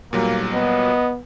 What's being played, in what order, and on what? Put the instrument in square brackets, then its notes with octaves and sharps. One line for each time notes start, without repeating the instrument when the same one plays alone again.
[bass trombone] B1 [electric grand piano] A#2 F#3 G3 [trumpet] A#3
[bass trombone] B3 [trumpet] D#5